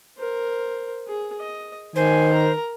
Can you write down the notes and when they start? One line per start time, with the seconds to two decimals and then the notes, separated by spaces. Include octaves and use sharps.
0.18 A#4 C5
1.07 G#4
1.40 D#5
1.96 D#3 C5 G#5
2.32 A#4 A#5